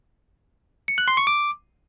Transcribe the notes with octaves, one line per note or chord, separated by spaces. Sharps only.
C#7
F#6
C6
C#6
D6